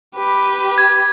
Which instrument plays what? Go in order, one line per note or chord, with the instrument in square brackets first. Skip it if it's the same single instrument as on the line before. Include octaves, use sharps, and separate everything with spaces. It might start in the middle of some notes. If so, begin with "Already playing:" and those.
[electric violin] G4 B4
[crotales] G#6